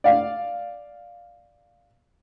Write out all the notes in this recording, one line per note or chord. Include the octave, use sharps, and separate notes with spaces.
D5 F5